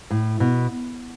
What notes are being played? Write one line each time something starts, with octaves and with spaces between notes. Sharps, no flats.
A2
B2